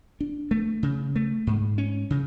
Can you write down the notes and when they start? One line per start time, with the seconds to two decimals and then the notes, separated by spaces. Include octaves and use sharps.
0.21 D4
0.51 A3
0.83 C#3
1.16 A3
1.47 G#2
1.78 C#4
2.10 C#3